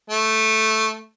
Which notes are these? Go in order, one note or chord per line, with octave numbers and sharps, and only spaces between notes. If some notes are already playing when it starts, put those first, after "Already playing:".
A3